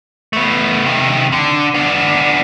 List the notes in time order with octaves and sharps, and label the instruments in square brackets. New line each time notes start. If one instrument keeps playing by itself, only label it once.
[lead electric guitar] A3 B3
C3 D#3
D3
B3 D4